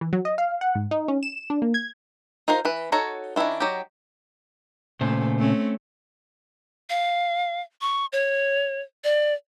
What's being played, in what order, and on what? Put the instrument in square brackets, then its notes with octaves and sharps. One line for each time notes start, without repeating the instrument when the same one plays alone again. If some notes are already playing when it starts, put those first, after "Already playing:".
[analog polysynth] E3
F#3
D#5
F5
F#5
G#2
D#4
C#4
E7
D4
A#3
G#6
[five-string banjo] D#4 F4 A#4 C5
E3 B4
D#4 F#4 A4 C#5 A#5
D#3 C#4 D4 E4 F4
F#3 D#4 G4
[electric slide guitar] A#2 C#3 C5 [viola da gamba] A3
[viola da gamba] A3 C4 C#4
[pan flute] F5
C#6
C#5
D5